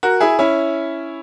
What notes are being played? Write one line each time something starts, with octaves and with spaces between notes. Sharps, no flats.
F#4 A#4
E4 G#4
C#4 E4